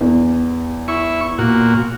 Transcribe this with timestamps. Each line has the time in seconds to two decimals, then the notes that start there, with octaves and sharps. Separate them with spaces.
0.01 E2
0.88 E4 C#6
1.39 A#2 F#4